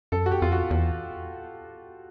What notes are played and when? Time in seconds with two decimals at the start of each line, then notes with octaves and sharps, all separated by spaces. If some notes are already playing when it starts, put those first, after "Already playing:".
0.12 F#2 A4
0.26 F#4
0.31 G4
0.42 F2 F4
0.52 F#4
0.71 E2